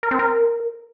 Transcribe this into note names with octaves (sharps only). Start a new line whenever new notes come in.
A#4
C4
A#4